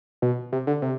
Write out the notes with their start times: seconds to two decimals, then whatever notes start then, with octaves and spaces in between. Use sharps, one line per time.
0.22 B2
0.52 C3
0.67 D3
0.82 C3